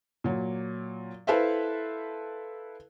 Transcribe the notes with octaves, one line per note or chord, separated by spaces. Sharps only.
A#2 F#3
E4 A4 B4 C5 E5 F5